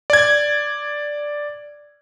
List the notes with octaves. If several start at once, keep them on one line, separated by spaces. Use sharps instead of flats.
D5 G#6